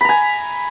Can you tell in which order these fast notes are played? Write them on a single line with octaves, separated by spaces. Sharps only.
B5 A#5 G#5